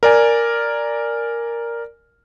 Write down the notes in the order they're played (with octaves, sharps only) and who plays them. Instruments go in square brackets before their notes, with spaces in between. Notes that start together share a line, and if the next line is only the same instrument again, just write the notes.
[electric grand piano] A#4 D5 G#5